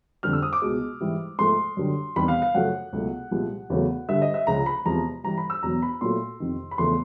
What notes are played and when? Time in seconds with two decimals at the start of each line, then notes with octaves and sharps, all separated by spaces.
0.23 F2 D3 G3 F6
0.33 E6
0.42 D#6
0.53 D6
0.62 C#2 B2 G#3
1.01 G#2 E3 G3
1.39 G#2 F3 A3 C6
1.77 F#2 D3 G3
2.16 E2 C3 D#3 G3 B5
2.28 F5
2.42 F5
2.55 F#2 C#3 F3 A3 F#5
2.93 C#2 B2 F#3 A3
3.31 C2 A#2 F3 G#3
3.70 E2 C#3 F#3 A3
4.08 G2 D3 G3 E5
4.22 D#5
4.34 E5
4.47 C#2 C#3 F3 G#3 A#5
4.66 B5
4.86 E2 C3 F3 G#3 A#5
5.24 G2 E3 G3 A#5
5.38 B5
5.50 E6
5.63 E2 B2 F#3 A#5
5.82 B5
6.01 A#2 F#3 A3 C6
6.40 F2 C3 D#3
6.71 B5
6.78 E2 C#3 F3 A3 C6